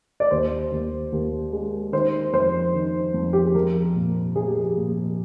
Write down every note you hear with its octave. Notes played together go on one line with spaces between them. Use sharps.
D5
D#2 C5
D#2
D#2
G#3
D#3 C5
F2 C5
D#3
F2
G4
G#4
F3 A#4
A#2
F3 G#4
G4
G#4
A#2